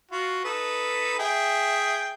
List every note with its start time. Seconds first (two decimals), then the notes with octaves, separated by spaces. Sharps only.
0.11 F4 F#4
0.45 D#4 A4 B4
1.19 G#4 E5 G5